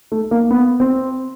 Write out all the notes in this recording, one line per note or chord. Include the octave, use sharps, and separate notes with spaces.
A3
A#3
B3
C4